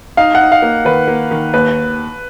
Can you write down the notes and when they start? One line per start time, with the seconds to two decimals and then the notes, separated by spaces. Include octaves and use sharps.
0.17 D#4 F5
0.35 F#5
0.41 D#4
0.52 F5
0.62 A#3
0.85 D#3 B4
1.08 A#3
1.31 D#3
1.54 D#2 B4